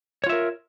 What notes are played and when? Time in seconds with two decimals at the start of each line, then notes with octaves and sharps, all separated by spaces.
0.24 C#5
0.27 F4
0.29 E5
0.32 A#4